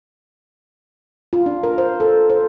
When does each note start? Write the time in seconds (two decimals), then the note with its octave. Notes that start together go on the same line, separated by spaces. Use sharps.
1.33 F4
1.46 D4
1.63 A#4
1.78 C5
2.00 A4
2.30 C5